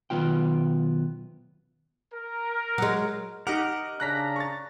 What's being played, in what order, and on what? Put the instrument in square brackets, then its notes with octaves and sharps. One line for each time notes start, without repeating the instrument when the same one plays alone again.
[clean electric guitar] B1 E2 D#3 B3 F4 G5
[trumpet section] A#4
[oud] F#3 G#3
[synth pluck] D#4 G4 D6 [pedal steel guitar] A#4 D#5 [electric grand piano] F#5
[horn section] C#3 D4 A#5 [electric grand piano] F#6 A#6 B6
[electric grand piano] C#6 A6